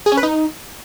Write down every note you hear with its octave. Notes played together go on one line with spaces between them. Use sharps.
G#4
C#4
B4
D#4